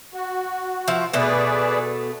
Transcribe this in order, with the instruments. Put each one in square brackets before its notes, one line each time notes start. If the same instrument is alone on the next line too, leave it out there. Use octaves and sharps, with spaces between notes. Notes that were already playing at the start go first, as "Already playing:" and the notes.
[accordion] F#4
[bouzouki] F3 E5
[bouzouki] B2 A3 [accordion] G#4 B4 D5